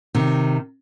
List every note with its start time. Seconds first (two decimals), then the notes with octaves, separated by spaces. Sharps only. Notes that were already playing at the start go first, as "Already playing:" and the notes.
0.15 C3 D#3